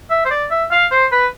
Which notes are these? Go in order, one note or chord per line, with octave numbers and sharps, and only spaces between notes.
E5
C5
D5
E5
F5
C5
B4